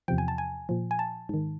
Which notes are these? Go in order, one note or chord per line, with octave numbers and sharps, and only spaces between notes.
E2 C3 F3 G5
G#5
A5
G#5
A#2 F3
G#5
A5
G#2 D#3